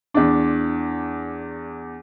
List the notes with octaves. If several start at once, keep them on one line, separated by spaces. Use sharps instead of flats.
E2 D4